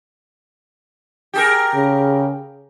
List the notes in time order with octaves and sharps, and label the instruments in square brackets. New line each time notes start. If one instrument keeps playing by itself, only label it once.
[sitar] G4 G#4 A#4
[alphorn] C#3